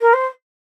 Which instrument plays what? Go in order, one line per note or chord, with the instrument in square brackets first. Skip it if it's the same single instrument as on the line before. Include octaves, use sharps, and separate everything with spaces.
[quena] A#4
C5